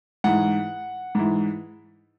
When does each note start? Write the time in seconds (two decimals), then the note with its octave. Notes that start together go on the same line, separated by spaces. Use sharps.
0.24 G#2 E3 F#5
1.15 G#2 E3